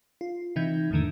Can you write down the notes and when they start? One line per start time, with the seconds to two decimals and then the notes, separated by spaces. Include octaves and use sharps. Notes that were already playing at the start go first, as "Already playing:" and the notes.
0.21 F4
0.56 C3 E3 D#4 E5 G6 G#6
0.91 E2 G#2 D3 D#3 A3